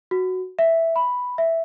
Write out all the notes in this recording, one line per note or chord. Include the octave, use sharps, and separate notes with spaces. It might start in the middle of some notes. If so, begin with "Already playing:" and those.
F#4
E5
B5
E5